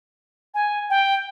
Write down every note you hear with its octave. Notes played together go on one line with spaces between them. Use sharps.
G#5
G5